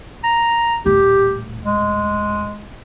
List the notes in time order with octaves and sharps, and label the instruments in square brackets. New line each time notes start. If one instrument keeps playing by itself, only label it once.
[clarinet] A#5
[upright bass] D#1 A2 [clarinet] G4
[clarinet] G#3